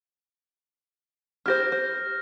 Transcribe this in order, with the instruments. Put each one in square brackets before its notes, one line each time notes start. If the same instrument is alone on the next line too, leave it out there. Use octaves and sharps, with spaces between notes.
[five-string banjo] E4 G4 C5 [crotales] F6 A#6
[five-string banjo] C5